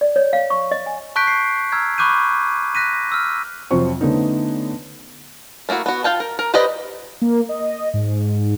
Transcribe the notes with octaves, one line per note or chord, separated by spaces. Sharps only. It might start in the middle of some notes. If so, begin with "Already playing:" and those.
D5
C#5
F5
C#6
D#5
G#5
A5 C#6 F#6 G6 B6 D7
C7
A#5 E6 F6 G#6
B5 C#6 D6 F#6 G6 D#7
F#6 A#6 B6 D#7
E6 F6
F2 C3 F#3 C5 C#6
D3 A3 B3 C#4 D#4
A3 A#3 E4 F#4
B3 F#4
F4 F5 G5 A5
A#4
A#4
G4 B4 C5 D5 D#5
A#3
D#5
G#2